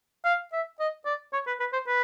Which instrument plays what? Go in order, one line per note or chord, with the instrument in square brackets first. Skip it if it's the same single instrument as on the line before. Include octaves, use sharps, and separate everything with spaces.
[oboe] F5
E5
D#5
D5
C#5
B4
B4
C5
B4